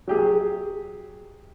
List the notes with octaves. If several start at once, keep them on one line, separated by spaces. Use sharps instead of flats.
F#3 G4 G#4